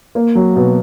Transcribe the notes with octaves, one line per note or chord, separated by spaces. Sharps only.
A#3
F#3
B2